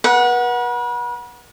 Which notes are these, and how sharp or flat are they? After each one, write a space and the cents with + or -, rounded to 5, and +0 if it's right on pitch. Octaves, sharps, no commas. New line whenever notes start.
B4 -40 F#5 -5